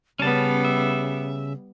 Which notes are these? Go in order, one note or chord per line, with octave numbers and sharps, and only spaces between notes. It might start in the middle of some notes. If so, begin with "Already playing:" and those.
C#3 G3 B3 C#4 A5
E5